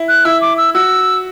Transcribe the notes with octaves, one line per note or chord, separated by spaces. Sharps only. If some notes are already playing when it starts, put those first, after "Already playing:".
Already playing: E4
F#6
E4 E6
D6
E6
F#4 E6